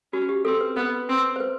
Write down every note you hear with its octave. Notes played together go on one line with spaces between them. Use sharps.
C#4 F#4
G4
C4 A4
B4
B3 B4
C4
C5
B4